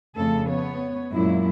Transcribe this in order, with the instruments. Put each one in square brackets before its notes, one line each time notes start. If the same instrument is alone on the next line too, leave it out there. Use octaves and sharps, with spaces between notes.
[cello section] F2 C#3 A3 A4
B3 C#5
F#2 A#2 G#3 E4